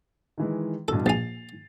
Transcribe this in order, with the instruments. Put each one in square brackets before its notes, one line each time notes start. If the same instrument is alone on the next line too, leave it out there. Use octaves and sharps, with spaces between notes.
[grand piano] D#3 E3 G#3
[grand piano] G2 B2 E3 [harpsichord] A4
[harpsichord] A#1 G#5 [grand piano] A6 C7 F7